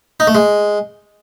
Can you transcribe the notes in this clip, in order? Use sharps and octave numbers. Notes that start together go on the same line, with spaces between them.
D#4
A3
G#3